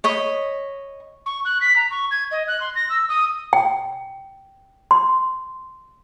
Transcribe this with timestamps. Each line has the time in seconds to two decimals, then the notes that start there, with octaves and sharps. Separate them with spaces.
0.04 C#5 D#5 B5
1.26 C#6
1.45 F#6
1.61 B6
1.76 A#5
1.91 C#6
2.11 G#6
2.31 D#5
2.48 F#6
2.61 C6
2.75 A#6
2.90 E6
3.09 D#6
3.53 G5
4.91 C6